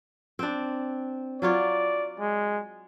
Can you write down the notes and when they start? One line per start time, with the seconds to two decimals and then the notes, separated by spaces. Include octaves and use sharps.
0.39 C4 D4
1.42 F#3 F4 C#5 D5
2.20 G#3